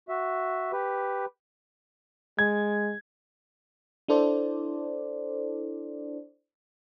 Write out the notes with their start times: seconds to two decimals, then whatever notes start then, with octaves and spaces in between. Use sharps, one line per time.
0.09 F#4 E5
0.72 G4 B4
2.39 G#3 G#6
4.08 D4 E4 A4 C5 D5